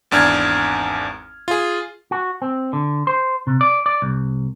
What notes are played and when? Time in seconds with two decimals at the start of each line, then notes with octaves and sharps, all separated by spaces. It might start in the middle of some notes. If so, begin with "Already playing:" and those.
0.11 G#1 E2 D4 F6 G#6
1.48 F4 G#4
2.11 F#4
2.42 C4
2.73 D3
3.07 C5
3.47 C3
3.61 D5
3.86 D5
4.02 C2